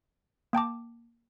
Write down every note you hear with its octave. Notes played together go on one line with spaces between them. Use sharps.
A#3 G5 A5 D6